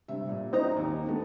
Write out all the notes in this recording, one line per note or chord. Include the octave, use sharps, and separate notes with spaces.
G2 C3 E5
A#2
F#2 C4 D#4 E4 A#5
D#2
D3 A3 B3